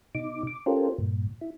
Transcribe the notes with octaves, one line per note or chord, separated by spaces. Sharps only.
B2 D#4 D6
D6
C#4 F4 G4 A4 A#4 C5
G2 A#2
E4